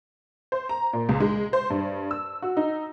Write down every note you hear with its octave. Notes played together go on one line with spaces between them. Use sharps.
C5
A#5
A#2
C#2
G#3
C5
G2
E6
F#4
D#4